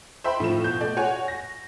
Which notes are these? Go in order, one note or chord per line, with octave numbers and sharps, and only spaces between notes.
C5 E5 G5 B5 C6
A2 F3 F4 E7
B2 G6
A3 D5
F#4 C#5 F#5 G#5
A#6